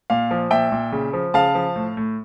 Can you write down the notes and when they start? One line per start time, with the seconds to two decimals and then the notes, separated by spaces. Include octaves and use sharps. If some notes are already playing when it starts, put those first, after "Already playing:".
0.10 A#2 F5
0.31 F3
0.51 A#2 E5 G5
0.72 A#2
0.92 C#3
1.13 F3
1.34 C#3 F5 A5
1.55 F3
1.76 A2
1.97 A2